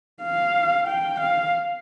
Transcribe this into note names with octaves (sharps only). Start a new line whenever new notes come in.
F5
G5
F5